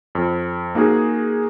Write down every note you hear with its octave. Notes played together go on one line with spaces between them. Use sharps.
F2
A#3 D#4 F#4 G#4